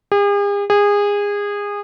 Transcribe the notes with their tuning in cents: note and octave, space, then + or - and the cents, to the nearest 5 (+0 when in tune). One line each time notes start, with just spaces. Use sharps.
G#4 -45
G#4 -25